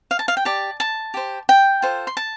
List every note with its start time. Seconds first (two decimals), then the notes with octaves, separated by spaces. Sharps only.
0.11 F5
0.19 A5
0.28 F5
0.37 G5
0.45 G4 D5 A5
0.80 A5
1.14 G4 C5
1.49 G5
1.82 F4 A4 C5
2.07 C6
2.17 A5